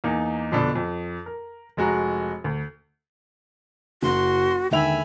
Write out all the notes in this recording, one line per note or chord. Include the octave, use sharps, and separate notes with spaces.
E2 A#3 D#4
F2 B2 D3 D4
F2
A#4
F1 G#3 F#4 A#5
D2
F#1 F#4 C6
D#2 D3 G#3 E5 G5 G#5 B5 F7